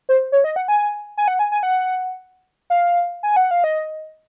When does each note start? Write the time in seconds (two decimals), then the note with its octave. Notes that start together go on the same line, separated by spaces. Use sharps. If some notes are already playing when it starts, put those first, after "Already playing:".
0.09 C5
0.32 C#5
0.44 D#5
0.56 F#5
0.68 G#5
1.17 G#5
1.28 F#5
1.39 G#5
1.52 G#5
1.63 F#5
2.70 F5
3.23 G#5
3.36 F#5
3.51 F5
3.64 D#5